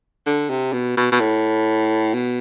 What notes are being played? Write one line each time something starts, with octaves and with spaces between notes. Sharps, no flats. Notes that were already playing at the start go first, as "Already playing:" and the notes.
D3
C3
B2
B2
B2
A2
B2